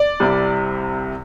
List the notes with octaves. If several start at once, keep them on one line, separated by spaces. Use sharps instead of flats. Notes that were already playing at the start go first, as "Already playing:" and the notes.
Already playing: D5
C2 C3 G3